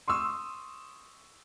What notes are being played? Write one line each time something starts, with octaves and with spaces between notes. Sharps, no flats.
C6 C#6 D#6 E6